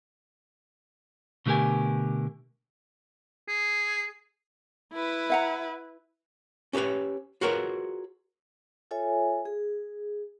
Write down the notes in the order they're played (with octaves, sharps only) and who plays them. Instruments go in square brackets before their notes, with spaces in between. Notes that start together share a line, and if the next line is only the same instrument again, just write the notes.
[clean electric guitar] B2 D3 A3 G4 A#4 G#5
[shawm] G#4
[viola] E4 B4
[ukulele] E5 F#5 A#5
[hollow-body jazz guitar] C#4 G4 A4 B4 C#5
F4 F#4 G#4 A#4 B4 C#5
[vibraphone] F4 A4 C#5 E5 G#5
G#4